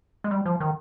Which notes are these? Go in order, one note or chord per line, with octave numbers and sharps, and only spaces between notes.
G#3
G3
F3
D#3